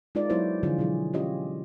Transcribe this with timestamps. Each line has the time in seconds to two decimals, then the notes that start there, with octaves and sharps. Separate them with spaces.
0.15 G#3 D#4 F4 A#4 D5
0.30 F#3 B3 E4 F#4 C5 C#5
0.63 D3 E3 F3 F4 G#4
0.78 B2 F#3 E4 G#4
1.13 C#4 F4 G4 C#5 D#5